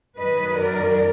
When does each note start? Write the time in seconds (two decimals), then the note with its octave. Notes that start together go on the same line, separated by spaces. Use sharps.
0.18 F#2 D#3 F#3 B4 D#5
0.58 A#4 D5